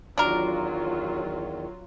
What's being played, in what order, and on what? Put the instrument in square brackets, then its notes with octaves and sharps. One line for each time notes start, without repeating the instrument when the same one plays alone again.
[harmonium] E2 D#3 [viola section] F#3 F4 [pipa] D4 A#4